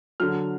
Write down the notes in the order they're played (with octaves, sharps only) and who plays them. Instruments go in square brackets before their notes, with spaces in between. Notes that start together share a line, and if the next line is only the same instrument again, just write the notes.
[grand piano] D3 F#3 F6